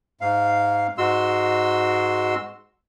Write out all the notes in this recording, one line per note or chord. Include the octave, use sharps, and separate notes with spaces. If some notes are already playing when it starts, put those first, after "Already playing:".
G#2 F5
G#2 G#3 F#4 C6 E6